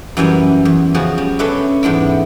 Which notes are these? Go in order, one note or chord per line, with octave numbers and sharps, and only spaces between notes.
F#2 E3 G3 G#5
E2
C#3 F3 F#4 G#4
G3
C#4 D4 A4 B4 D5 E5
E2 G#2 B3 D4 E4